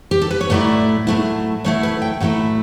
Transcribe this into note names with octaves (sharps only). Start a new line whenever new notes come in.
G4
A4
B4
C#5
A2 F#3 A3 E4 D5
A2 F#3 A3 E4
A2 F#3 A3 E4 C#5
B4
G5
A2 F#3 A3 E4 F#5